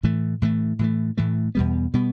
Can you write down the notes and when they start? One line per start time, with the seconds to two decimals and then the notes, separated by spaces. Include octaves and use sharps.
0.03 A2 E3 A3
0.42 A2 E3 A3
0.79 A2 E3 A3
1.17 A2 E3 A3
1.55 E2 B2 G3 B3
1.94 B2 G3 B3